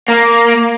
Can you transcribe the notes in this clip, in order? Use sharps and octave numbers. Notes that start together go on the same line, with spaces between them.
A#3